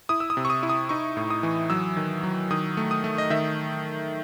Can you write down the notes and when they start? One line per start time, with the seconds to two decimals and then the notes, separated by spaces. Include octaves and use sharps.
0.09 E4 D#6
0.20 E6
0.30 D#6
0.37 C3
0.45 C#6
0.50 D#6
0.63 E4
0.69 D#6
0.89 D#4 C#6
1.17 A2
1.30 D#6
1.43 E3
1.70 F#3 E6
1.97 D#3
2.23 F#3
2.51 D#3 D#6
2.77 A3
2.91 D#6
3.04 A3
3.18 D#5
3.30 D#3 E5